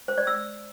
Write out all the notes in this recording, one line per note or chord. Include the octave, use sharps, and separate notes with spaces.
C5
D5
E6